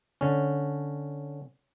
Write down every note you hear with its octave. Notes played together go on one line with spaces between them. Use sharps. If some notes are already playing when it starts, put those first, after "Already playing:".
D3 C#4